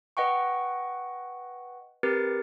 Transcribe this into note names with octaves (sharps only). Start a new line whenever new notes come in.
B4 D#5 F#5 G5 C#6
C4 G4 A#4 B4 A6 C#7